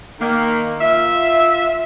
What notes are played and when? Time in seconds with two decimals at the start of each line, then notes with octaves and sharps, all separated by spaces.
0.20 D#3 A#3
0.81 F4 E5